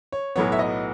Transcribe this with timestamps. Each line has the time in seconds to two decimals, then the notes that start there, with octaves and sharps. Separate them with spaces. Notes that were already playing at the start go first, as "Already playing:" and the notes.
0.12 C#5
0.35 B1 A2 F#3 B3 C#5
0.52 E5
0.59 D#5